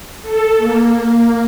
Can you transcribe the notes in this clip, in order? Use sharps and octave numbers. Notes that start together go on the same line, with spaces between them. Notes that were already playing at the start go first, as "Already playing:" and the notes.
A4
A#3